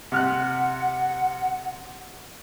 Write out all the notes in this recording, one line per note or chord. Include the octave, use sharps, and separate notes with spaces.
C3 F#5 F6 F#6